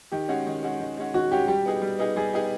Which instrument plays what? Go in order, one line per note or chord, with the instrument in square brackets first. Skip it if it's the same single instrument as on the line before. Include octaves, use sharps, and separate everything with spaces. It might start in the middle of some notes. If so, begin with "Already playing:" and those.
[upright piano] D#3 [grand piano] G4
[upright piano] G#3 C#4 F#4
D#3
G#3 C#4 F#4
D#3
G#3 C#4 F#4
[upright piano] D#3 [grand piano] F#4
[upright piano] G#3 C#4 F#4 [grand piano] G4
[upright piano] G3 [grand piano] G4
[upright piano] B3 D#4 G#4
G3
B3 D#4 G#4
[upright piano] G3 [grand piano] G#4
[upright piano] B3 D#4 G#4 [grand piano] G4